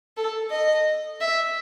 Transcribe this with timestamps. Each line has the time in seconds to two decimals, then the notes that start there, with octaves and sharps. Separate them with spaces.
0.17 A4
0.51 D#5
1.21 E5